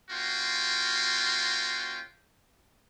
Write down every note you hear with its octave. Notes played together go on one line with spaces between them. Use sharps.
A#3 C#4 F4 F#4 G5 C6